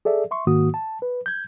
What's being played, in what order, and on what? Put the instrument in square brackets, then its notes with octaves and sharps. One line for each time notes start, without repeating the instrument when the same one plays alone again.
[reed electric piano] G#4 A4 D5 E5
E5 C6 C#6
G#2 D#3 A#3 F#4 D#6
A5
B4
G6 G#6